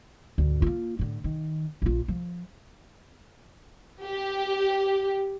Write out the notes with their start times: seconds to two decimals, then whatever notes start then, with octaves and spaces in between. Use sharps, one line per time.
0.38 G#1 D2
0.62 A#3 F4
0.99 A2 D3
1.24 D#3
1.82 A#1 F4
2.08 F3
4.06 G4